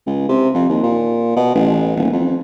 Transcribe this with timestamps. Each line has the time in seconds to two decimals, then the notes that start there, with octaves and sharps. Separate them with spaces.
0.06 C#2
0.29 C3
0.54 F2
0.69 D#2
0.83 A#2
1.36 B2
1.55 A1
1.96 D#1
2.12 F2